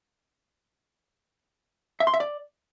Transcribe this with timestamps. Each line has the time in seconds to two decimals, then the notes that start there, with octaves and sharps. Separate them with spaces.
2.00 E5
2.07 C6
2.14 E5
2.20 D5